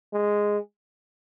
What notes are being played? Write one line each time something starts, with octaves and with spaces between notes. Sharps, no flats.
G#3